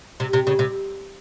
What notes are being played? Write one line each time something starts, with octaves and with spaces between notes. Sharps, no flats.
C3
C3
C#3
C3